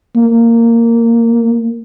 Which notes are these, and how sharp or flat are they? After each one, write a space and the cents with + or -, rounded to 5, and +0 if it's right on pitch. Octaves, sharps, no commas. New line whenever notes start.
A#3 -10